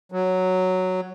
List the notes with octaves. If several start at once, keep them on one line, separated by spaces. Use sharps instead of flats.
F#3